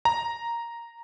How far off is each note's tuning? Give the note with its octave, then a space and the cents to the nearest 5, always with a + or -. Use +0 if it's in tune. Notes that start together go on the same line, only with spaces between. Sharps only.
A#5 +0